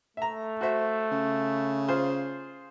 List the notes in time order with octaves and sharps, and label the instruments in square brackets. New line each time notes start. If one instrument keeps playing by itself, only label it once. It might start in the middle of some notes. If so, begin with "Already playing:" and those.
[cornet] A3 [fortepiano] E5 A#5
[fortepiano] F#4 C5 E5
[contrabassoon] C#3
[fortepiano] F4 G#4 C5